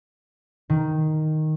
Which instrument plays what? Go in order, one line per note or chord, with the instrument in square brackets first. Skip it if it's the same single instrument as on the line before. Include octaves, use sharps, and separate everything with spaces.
[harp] D#3